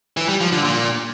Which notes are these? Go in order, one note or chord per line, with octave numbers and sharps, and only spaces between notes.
E3
G3
F3
D3
A#2